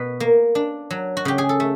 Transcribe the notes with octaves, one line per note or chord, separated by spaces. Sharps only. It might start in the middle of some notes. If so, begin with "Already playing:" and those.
Already playing: B2 B4
A#3
D4
F#3
F#4
C#3 G4
G#4
A4
A3